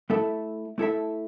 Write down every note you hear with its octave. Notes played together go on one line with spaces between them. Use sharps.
A3 E4 A4 E5
A3 E4 A4 E5